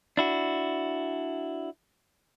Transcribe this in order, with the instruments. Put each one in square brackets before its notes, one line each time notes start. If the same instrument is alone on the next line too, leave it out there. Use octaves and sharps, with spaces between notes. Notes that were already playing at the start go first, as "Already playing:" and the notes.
[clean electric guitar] D4 E4 F#4